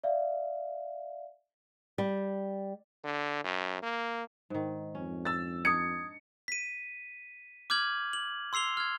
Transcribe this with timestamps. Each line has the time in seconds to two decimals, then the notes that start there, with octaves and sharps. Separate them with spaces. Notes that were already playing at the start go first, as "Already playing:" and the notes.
0.04 D5 E5 F5
1.98 G3
3.04 D3
3.44 F#2
3.82 A#3
4.50 G#2 D#3
4.95 F2 C#4
5.25 E6 A6
5.65 D4 D#4 D#6 G#6 C#7
6.48 B6 D#7
7.70 D6 F6 G6 G#6 F#7
8.13 F#7
8.53 C6 E6 C7 F7 G7
8.77 F6 G#6